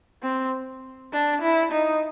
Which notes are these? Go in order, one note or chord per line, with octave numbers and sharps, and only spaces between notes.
C4
D4
E4
D#4